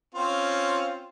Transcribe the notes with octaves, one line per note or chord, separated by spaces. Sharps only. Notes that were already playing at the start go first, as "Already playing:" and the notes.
C4 C#4 F4